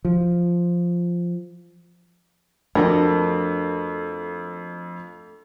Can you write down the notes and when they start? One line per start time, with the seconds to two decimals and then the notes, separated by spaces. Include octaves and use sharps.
0.05 F3
2.75 F2 A3 D4 F#4 A#4